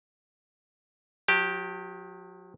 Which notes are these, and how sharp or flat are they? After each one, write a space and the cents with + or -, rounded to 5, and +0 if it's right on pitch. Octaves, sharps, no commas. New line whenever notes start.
F#3 -45 G4 -5